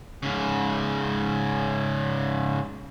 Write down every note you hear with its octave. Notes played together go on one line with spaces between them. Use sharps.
G#2 C#3